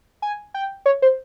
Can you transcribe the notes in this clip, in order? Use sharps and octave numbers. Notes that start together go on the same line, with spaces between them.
G#5
G5
C#5
C5